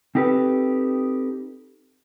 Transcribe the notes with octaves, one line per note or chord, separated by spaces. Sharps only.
C4 D#4 G4 A4 B4